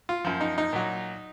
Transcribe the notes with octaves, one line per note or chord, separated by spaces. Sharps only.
F4
F#2 F3
D#4
D#4
A#2 F#3